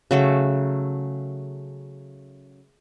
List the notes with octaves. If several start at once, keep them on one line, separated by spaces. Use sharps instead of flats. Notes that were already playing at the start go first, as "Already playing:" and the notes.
C#3 F#3 A3